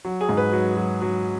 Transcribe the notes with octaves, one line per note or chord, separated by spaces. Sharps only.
F#3
G#4
G#2
B4
F#3
F#3
F#3